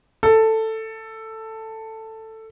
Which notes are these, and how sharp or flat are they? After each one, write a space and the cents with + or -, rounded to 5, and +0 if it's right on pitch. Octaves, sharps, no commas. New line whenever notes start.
A4 +10